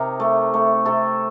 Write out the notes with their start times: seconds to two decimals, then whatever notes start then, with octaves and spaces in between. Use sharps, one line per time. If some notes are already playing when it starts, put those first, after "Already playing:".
Already playing: C3 C4 D#4 G4 A#4
0.20 A3
0.54 A3
0.85 C3 A4